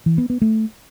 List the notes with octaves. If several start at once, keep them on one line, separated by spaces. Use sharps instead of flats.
E3
B3
B3
A3